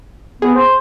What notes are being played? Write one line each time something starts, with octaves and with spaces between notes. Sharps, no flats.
B3 G#4
C5